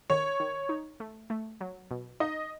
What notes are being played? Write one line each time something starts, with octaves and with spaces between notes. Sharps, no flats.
D#3 C#5
D#3
D#4
A3
A3
F#3
B2
D#4 D#5